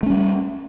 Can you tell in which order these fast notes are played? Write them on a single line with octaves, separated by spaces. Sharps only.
A3 C#4 G3